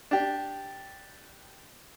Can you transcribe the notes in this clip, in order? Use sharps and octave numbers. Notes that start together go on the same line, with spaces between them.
D4 G4